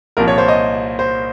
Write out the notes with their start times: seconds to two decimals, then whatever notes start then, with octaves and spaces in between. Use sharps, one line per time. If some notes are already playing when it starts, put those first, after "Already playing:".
0.17 C2 A#2 F3 A#4
0.28 C#5
0.38 C5
0.48 D#5
0.99 C5